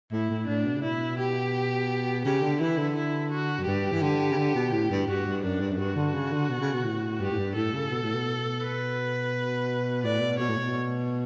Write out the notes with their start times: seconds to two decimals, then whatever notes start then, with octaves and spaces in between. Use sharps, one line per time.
0.12 A2 E4
0.30 A2
0.47 A2 D4
0.65 B2
0.75 C#3
0.83 B2 E4
1.19 G4
2.25 C#3 G4
2.42 D3
2.60 E3 E4
2.77 D3
2.96 E4
3.30 F#4
3.59 F#2
3.67 G2 G4
3.92 E3
4.02 D3
4.32 C#3
4.38 D3
4.55 B2
4.72 A2
4.90 G2
5.07 G2 F#4
5.26 G2
5.43 F#2 D4
5.60 G2
5.71 F#2
5.78 G2 F#4
5.96 D3
6.14 C#3
6.32 D3
6.49 B2
6.61 C#3
6.73 B2
6.85 A2
7.20 G2 G4
7.31 A2
7.38 G2
7.55 A2 A4
7.74 C#3
7.90 B2
8.03 A2
8.14 B2
8.62 B4
10.03 A2 D5
10.21 B2
10.39 B2 C#5
10.49 A2
10.57 B2